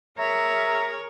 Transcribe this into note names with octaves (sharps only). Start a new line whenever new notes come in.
G#4 A#4 C#5 E5 A#5